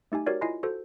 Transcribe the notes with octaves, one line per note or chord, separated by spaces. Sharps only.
A3 D#4 G4 G#5
F#4 G4 A#4 C#5 D5
E4 F4 D#5 G#5 C7
F#4 A4 C5